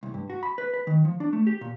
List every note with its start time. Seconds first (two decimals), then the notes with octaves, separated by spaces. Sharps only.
0.03 C2
0.14 G2
0.30 F#4
0.43 B5
0.58 B4
0.74 B4
0.87 D#3
1.05 F3
1.20 D4
1.33 A3
1.47 G4
1.61 A#2